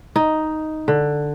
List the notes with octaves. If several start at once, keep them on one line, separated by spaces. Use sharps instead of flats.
D#4
D3